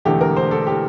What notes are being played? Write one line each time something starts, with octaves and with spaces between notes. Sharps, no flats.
E1 E2 D3 A3 G4
A#4
C5
A4
G4